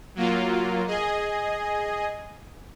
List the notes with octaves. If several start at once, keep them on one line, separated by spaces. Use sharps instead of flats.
F#3 A#3 F4
G#4 D#5